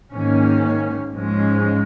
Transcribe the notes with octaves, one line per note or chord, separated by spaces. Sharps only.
G#2 D#3 A#3 C#4
G#2 F3 G#3 C#4